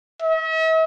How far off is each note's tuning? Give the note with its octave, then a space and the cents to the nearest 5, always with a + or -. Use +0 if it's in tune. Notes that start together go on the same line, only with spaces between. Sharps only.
E5 -45